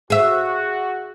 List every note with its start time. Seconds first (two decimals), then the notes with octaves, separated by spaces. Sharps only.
0.10 F#4 G#4 E5